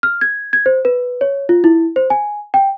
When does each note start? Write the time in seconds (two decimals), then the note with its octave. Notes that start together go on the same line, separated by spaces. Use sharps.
0.03 F6
0.21 G#6
0.53 G#6
0.66 C5
0.85 B4
1.21 C#5
1.49 F4
1.64 E4
1.96 C5
2.10 G#5
2.54 G5